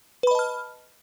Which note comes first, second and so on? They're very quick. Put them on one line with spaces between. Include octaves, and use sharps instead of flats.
B4 B5 D#5 A5 F6